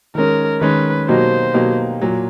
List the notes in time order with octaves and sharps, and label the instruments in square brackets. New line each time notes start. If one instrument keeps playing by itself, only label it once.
[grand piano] D#3 G#3 C#4 [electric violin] A#4
[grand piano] D#3 G#3 C#4 [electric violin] B4
[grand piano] B2 F#3 A#3 D#4 G4 [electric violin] C5
[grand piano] B2 F#3 A#3 D#4 G4
A#2 F#3 A#3